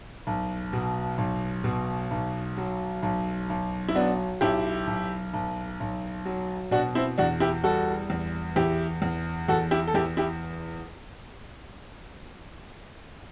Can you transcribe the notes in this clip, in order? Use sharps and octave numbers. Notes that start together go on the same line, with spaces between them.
B1
B2
B1
B2
B1
F#3
B1
B1
E4
F#3 B3 D4
B1 E4 G4
B1
B1
B1
F#3
B2 D4 F#4
C4 E4
E2 D4 F#4
E4 G4
G3 F#4 A4
E2
E2 E4 G4
E2
E2 F#4 A4
E4 G4
A4
E2 E4 G4
E4 G4